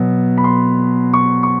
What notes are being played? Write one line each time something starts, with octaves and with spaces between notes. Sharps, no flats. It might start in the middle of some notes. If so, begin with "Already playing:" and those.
Already playing: B2 F#3 B3
B5
C6
C#6
C#6